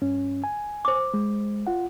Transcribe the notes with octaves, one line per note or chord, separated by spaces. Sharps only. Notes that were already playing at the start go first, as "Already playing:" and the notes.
G2 C#4
G#5
C5 D6
G#3
F4 F#5